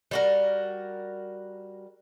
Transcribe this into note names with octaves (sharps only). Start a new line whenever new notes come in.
G3 F#4 A#4